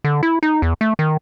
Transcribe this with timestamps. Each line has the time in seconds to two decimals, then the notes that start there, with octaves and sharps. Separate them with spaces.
0.04 D3
0.23 E4
0.43 D#4
0.62 E2
0.81 A3
0.99 D#3